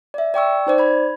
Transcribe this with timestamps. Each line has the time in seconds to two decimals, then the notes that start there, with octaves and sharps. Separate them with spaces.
0.14 D5 E5
0.34 D5 G5 C#6 E6
0.67 D#4 C5 D5
0.78 B5 G#6